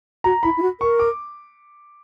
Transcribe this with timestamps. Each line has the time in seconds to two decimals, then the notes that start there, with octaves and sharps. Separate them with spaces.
0.24 F#4 A#5
0.43 E4 B5
0.57 E4
0.62 F#4
0.80 A#4 C#6
0.99 D6